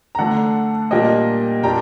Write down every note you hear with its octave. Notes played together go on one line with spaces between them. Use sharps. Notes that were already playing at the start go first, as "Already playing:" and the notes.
A#5
D3 A3 D4 F#5 A5
A#2 G3 A#3 D4 D#5 G5
A#2 G3 D4 G5 A#5